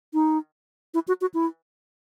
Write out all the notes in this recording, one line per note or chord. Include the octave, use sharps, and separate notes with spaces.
D#4
E4
F#4
F#4
E4